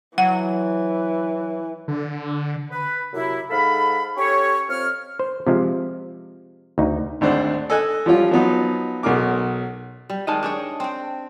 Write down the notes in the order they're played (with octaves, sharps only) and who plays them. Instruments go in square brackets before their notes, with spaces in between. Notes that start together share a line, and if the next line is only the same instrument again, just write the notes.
[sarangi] E3 [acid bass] F#3 [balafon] F#5
[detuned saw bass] D3
[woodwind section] B4
F#2 C3 E4
G#2 A4 F5 B5
C#4 G4 A4 C#5
F2 C#5 F6
[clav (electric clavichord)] C5
C3 F3 G#3
D2 D#4
[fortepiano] G#1 D2 D4 C5 F#5
A4 D#5 G#5 F#6
F3 G3 C#4 F4
F3 F#3 B3 D#4
B1 F#3 G#4 A#4 D6
[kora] G3
[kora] D#3 G3 G#3 [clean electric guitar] D#5 A5
[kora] D4 G#4 C#5
C4 G5